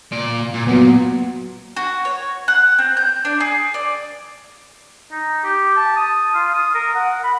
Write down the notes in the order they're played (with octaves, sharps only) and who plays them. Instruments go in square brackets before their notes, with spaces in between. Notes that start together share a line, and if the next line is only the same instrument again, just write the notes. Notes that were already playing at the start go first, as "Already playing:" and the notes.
[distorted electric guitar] A#2 D5
A#2
[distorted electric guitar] A#2 [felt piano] F#3 B3
[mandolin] F#4
C#5
F#5
C4
G6
D4
G#4
D5
[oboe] D#4
G4
A5
D#6
F4
D#6
A#4
F#5
B5